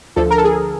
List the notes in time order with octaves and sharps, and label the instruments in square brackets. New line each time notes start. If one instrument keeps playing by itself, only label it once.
[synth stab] D2 D3 F3 A4
A#4
A4
G#4